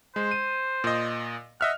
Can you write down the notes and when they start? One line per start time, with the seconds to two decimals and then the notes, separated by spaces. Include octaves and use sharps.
0.16 G#3 C5
0.31 D#7
0.84 A#2 D#5
1.61 D#5 E5 F#5 F6